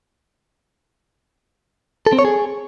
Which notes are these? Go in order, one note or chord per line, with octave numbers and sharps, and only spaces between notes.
A4
C4
C#5
G#4